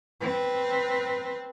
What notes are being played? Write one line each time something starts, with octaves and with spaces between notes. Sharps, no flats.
C4 B4